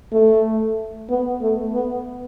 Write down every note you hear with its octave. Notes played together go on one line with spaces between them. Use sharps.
A3
B3
A3
B3